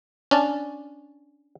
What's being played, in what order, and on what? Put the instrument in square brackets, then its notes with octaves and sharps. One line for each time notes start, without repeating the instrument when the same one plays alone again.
[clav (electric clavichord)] C#4 D4 A5